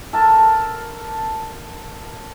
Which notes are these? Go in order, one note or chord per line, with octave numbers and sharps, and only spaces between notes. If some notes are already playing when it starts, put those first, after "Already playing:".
A4 A#4 A5